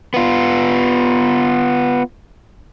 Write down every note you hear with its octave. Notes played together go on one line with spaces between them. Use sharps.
B3 F4